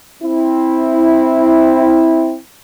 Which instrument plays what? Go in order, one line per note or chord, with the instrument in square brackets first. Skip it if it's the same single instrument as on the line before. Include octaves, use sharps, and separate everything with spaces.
[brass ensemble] C4 E4